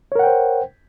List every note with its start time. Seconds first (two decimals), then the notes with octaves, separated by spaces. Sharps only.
0.12 C#5
0.16 A#4
0.19 F#5
0.23 G5
0.27 C5